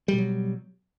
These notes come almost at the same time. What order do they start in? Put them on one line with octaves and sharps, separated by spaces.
G3 B2 F#3